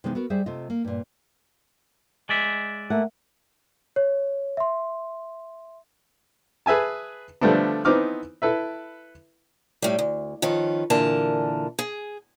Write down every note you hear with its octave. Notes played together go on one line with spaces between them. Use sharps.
C3 E3 G#3 B3 C#4 D#4
B3 F#4 A#4
G3 G#4 C5 E5
C3 A3 F4 D#5
A#3
G2 A#2
G#3 D5 E5
A3 A#3 F#5
C#5
E5 C6
G#4 B4 E5 G#5 A5
D3 F3 G3 A3 B3 D4
E3 B3 C4 D#4 D6 F6
E4 A4 B4 E5
A2 G3
D2
D#3 F3 C#4 B4
A#2 D3 E3 A#4 A5
G#4